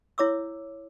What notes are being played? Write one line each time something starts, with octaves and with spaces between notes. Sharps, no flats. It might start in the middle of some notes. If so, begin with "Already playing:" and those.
E4 C#5 D6 E6